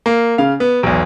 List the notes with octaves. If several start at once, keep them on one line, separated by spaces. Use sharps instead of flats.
A#3
C#3 F5
B3
B1 E2